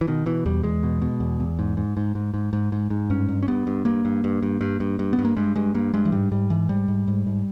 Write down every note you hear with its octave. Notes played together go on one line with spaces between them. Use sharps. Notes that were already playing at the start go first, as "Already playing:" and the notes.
E3
B2 D#3
B2 E3
E2 G3
E2 G#3
B2
B2
E2
E2
G#2
G#2
G#2
G#2
G#2
G#2
G#2
G#2
G2 C#4
G2
C#4
G2 B3
G2
G2 A#3
G2
G2
G2
G2
G2
G2
B3
G2
A#3
G2 G#3
G2 G#3
G2 A#3
G2 G#3
E3
G#2 G3
G#2 G3
G#2 E3
G#2 G3
G#2
G#2
G#2